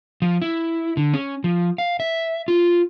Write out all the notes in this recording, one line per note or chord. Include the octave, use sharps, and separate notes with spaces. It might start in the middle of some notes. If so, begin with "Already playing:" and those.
F3
E4
D3
C#4
F3
F5
E5
F4